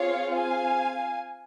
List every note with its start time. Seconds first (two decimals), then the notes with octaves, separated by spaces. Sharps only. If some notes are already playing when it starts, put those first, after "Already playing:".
Already playing: C4 F4 G#4 C#5 F5
0.35 F5 G#5